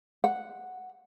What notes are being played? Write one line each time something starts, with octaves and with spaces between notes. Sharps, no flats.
F#5